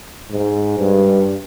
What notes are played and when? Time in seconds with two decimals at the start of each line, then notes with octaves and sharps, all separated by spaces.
0.31 G#2
0.78 G2